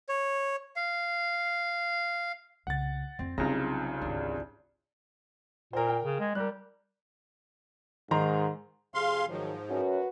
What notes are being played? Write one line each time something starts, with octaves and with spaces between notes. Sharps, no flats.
C#5
F5
C2 C#3 F#5 A6
F2 C4
C2 C#3 F#3 C4 D#4 F4 A#5
G#1 D2 D4
A#2 A#4 C5
A#4 G5
C#3
G#3
G3 A#4 F#6
G#2 D#3 A#5 C6
F2 C3 G#4 F5 C6
G#2 D#3 F3 F#3
F#2 F#4 B4